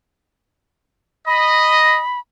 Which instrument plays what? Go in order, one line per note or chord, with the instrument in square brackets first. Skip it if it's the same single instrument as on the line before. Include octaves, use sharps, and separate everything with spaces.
[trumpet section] D#5 [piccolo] B5